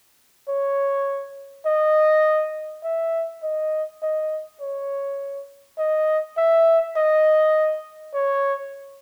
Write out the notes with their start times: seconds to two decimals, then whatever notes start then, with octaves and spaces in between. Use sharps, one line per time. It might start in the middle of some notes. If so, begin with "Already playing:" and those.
0.48 C#5
1.66 D#5
2.84 E5
3.43 D#5
4.02 D#5
4.61 C#5
5.78 D#5
6.38 E5
6.96 D#5
8.14 C#5